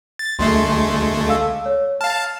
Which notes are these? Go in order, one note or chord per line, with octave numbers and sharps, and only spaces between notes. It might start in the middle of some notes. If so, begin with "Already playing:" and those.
A6
D2 G#3 A3 C6 C7
A4 F5 E6
C#5
F5 A5 F6